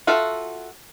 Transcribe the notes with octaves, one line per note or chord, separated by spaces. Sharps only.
F4 F#4 A4 E5